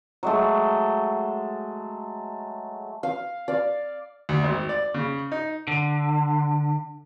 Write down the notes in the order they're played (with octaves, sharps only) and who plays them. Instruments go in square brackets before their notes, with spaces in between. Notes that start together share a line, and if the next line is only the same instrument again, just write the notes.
[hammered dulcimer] F#3 G#3 A3
[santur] F5
D5 F5
[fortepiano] D2
G#1
D5
C#3
D#4
[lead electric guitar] D3